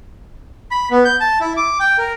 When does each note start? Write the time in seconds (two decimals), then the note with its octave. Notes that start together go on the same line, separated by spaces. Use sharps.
0.71 B5
0.91 B3
1.05 G6
1.20 A5
1.41 E4
1.57 D6
1.80 G5
1.98 A#4